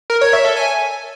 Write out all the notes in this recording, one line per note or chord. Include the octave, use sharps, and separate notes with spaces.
A#4
C#5
E5
A4
G#5